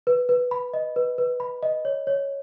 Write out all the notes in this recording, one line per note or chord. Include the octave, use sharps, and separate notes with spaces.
B4
B4
B5
D#5
B4
B4
B5
D#5
C#5
C#5